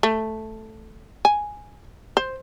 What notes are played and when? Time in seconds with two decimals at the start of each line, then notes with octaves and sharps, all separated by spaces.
0.03 A3
1.25 G#5
2.17 C5